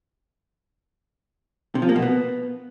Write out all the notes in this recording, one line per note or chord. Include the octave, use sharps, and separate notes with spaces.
C3
F3
A#3
B2
B3